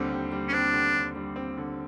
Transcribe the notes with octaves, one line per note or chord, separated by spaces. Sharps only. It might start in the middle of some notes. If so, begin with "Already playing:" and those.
Already playing: D#2 D3 G3 C4
D#2
G3
C#4
C4 D4
D3
D#2
G3
C4
D3